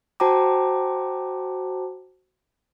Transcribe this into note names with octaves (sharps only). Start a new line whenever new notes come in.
F#4 C5 G5 A5 A#5 D6